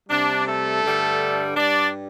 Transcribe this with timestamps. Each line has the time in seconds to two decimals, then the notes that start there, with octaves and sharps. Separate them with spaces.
0.09 C3 G3 D4
0.46 A3 A4
0.83 G2 D3 G3
1.56 G2 G3 D4 D5